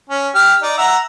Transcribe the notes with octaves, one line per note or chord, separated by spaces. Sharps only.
C#4
G4 F6
D#4 D5
E5 F#5 A#5